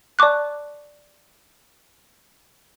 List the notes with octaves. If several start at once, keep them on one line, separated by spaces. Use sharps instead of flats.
D5 A5 C#6 D6 F#6